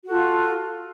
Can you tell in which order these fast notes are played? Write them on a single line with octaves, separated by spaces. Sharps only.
F#4 A4 F4